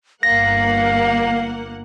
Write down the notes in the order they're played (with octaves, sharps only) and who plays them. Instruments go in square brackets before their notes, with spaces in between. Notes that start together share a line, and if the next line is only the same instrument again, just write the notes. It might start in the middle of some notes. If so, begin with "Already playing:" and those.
[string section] G1 A#3 F#5 [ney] F5 [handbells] A#6